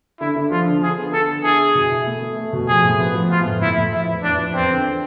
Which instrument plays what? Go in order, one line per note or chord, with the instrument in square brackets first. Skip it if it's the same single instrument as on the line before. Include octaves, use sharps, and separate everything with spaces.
[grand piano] D3 [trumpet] E4
[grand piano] D3
[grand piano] F3 [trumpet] F4
[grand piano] D3
[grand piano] D3 [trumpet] G#4
[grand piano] B3
[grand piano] D3 [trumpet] A4
[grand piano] D3
[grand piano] E4 [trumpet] G#4
[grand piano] E4
B2
E4
A3
A3
A3
B2
[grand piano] F3 [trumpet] G#4
[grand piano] A2
B3
F3
[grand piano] F3 [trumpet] F4
[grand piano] A2
[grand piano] A2 [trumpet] E4
[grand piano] A2
[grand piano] F3 [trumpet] E4
[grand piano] E2
[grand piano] E2 [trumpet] D4
[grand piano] F3
[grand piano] E2 [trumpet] C4
[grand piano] D3